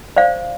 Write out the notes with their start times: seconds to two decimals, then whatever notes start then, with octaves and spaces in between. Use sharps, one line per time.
0.16 C5 D5 F5